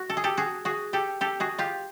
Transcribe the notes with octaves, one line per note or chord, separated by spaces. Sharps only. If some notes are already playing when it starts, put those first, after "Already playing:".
Already playing: F#4
A4
G#4
G4 A4
F#4 G#4
F#4 G#4
G4 A4
G4 A4
F#4 G#4
F4 G4